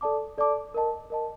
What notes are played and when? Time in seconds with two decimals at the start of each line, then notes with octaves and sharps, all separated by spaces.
0.01 A4 D5 A5 D6
0.38 A4 D5 A5 D6
0.74 A#4 D#5 A5
1.10 A#4 D#5 A5